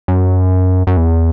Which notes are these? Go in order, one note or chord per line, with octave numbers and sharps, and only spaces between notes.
F#2
F#2
E2